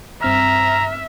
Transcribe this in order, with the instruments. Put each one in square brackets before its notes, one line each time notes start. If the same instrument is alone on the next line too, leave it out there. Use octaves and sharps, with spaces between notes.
[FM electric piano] G2 C4 F6 [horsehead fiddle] E5 [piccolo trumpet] A#5